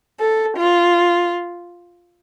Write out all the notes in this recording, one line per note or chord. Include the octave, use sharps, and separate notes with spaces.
A4
F4